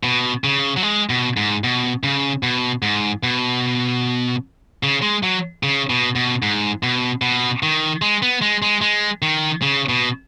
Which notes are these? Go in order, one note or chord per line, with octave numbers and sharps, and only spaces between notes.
B2
C#3
F#3
G#3
B2
G#2
B2
C#3
B2
G#2
B2
C#3
G#3
F#3
C#3
B2
B2
G#2
B2
B2
D#3
G#3
B3
G#3
G#3
G#3
D#3
C#3
B2